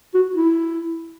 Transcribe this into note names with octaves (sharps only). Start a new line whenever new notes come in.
F#4
E4